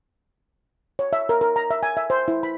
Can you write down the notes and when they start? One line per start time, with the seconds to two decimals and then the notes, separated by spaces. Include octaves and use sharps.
0.99 C#5
1.13 E5
1.29 A#4
1.41 A#4
1.56 A#5
1.71 E5
1.83 G#5
1.97 E5
2.10 C5
2.28 E4
2.43 B5